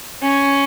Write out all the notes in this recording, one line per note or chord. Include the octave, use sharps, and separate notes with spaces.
C#4